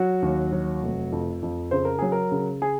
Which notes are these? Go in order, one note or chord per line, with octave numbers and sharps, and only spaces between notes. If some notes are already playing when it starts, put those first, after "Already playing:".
Already playing: F#3 F#4
D#2
F#3
F1
F2
F2
C#3 C5
A#4
F#3 G#4
A#4
C#3
G#4